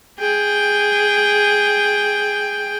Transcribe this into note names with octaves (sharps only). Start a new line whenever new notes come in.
G#4 G5